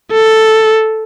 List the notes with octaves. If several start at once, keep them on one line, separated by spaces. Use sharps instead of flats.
A4